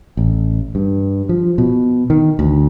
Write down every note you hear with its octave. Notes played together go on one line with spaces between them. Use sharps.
A1
G2
F3
B2
D#3
D2